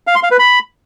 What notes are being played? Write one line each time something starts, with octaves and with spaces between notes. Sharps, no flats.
F5
C6
F5
B4
B5